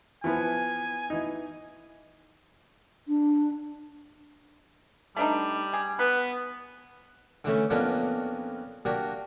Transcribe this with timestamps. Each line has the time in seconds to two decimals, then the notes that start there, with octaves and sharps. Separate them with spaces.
0.24 E3 F3 B3 G#5
1.10 E3 D#4
3.08 D4
5.16 G3 A3 D4 D#4
5.73 G#4
5.99 B3 B4
7.44 D3 E3 A3 C#4
7.70 F2 A#3 B3 C#4 D4
8.85 A#3 D4 F#4 G4